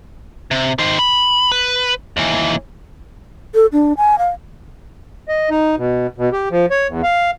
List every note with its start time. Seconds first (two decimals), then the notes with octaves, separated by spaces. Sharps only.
0.51 C3
0.79 D#3 C5
0.99 B5
1.52 B4
2.17 D#2 E3
3.55 A4
3.73 D4
3.97 G#5
4.18 F5
5.28 D#5
5.50 D#4
5.77 B2
6.18 B2
6.33 G4
6.51 F3
6.71 C#5
6.88 E2
7.03 F5